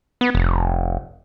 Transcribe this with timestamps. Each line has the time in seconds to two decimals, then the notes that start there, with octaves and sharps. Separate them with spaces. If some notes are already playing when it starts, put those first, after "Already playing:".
0.21 B3
0.35 F1